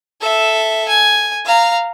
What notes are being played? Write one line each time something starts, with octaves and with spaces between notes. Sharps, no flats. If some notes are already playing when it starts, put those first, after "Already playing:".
A4 E5
G#5
F5 A#5